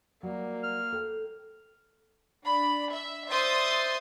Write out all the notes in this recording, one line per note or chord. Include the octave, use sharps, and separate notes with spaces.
F#3 G3 A#3
F6
A4 C5 G5
D4 B5
E5
C5 D5 E5 C6 D#6 A6